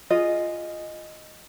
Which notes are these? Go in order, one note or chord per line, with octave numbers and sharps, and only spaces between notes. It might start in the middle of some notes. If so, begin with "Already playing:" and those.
F4 G#4 D#5